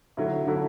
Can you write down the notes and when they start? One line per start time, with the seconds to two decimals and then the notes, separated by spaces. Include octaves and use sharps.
0.17 D3 F#3 A3 E4
0.47 D3 F#3 A3 E4